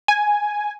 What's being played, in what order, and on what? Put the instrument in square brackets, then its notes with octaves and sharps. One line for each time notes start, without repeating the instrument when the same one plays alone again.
[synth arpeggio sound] G#5